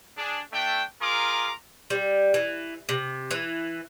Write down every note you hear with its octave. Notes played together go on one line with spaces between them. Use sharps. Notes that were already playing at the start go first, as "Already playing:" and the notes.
D4 G#4
A3 D4 G5
F4 G#4 A#4 A#5 C6 D6
G3
E3
C3
E3